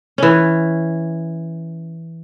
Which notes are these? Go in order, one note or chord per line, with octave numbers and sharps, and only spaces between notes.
E3 C#4